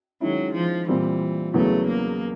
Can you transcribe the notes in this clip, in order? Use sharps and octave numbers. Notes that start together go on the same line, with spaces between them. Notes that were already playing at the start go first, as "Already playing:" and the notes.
D#3 F#3 G#3 C#4 E4
F3
A#2 E3 G3 C4
E2 C#3 F#3 A3 B3
A#3